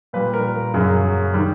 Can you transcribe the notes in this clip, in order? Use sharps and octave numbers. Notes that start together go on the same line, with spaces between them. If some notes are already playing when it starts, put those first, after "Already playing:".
A#2 G3 B4
A#4
F#2 C#3 F#3 G#4
D#3 G3